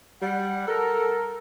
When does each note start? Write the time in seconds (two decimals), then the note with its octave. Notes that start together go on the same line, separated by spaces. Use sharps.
0.22 G3 F#5
0.68 A4 A#4